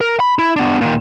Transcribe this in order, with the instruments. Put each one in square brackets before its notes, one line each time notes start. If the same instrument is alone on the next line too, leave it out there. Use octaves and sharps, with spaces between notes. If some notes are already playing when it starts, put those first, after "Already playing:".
[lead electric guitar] A#4
B5
E4
B3 D4
A#2 D#3